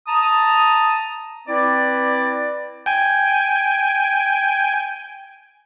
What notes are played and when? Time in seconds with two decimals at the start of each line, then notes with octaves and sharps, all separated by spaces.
0.08 A5 A#5 D#6
1.48 C4 E4 B4 D5
2.86 G5 G#5